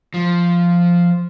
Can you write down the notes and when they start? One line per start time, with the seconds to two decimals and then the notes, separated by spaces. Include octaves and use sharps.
0.14 F3